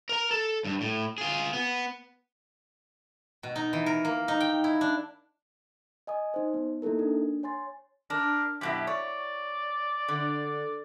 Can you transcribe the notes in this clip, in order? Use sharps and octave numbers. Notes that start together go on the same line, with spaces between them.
A#4 A#5
A4
G2
A2
F4 G#4
B3
B2
D#4
E3
A#4
A#3
D#4
G5
E4
D4
D#5 G#5 D#6
D#4 C5
B3
A#3 D#4 E4 A4 A#4
D4
C#5 G#5 C6 A6
D4 A#4
F#2 B2 E4 G4
C#5 D5
D3